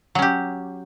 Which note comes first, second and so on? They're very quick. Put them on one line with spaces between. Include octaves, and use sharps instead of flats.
F#3 C#4 G4